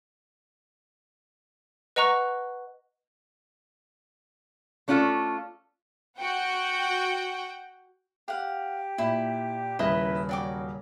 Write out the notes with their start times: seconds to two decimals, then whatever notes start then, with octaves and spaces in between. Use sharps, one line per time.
1.96 B4 D#5 F#5 A#5 C#6 F#6
4.88 A3 C#4 D4 F4 A4
6.19 F#4 F#5 G5
8.28 G4 F5 F#5
8.98 A#2 E4
9.79 D#1 C#3 E4 B4 D#5 D#6 A#6
10.29 F#3 D5 G5 D6